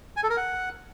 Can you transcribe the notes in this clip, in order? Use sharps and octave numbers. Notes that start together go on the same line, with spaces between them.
G#5
A4
A#4
F#5